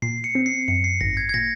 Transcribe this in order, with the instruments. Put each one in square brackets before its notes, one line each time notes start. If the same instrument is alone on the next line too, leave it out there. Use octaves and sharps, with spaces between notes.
[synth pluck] A#2 [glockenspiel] C7
[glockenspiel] C#7
[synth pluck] C4
[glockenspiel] C7
[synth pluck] F#2 [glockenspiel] C#7
[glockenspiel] C7
[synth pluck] G#1 [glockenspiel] A#6
[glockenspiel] G#6
G#6
[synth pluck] A#2 [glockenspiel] A#6